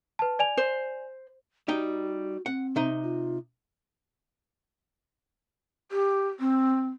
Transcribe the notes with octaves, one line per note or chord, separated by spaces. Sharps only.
B4 A5
D5 G#5 F7
C5
G3 D#4 F#4 G5
C4 F#5
C3 D#4
F4
G4
C4